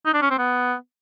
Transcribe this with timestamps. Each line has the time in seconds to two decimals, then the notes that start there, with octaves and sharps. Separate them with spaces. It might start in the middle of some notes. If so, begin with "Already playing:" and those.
0.06 D#4
0.14 D4
0.22 C#4
0.30 C4
0.38 B3